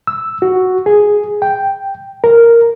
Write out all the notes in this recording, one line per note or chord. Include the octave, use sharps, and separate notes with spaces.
E6
F#4
G#4
G5
A#4